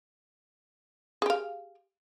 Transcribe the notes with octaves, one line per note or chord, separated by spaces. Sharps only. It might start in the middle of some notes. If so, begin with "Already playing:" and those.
G4 G#4 F5